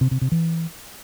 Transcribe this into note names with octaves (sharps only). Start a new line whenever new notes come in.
C3
C3
C3
E3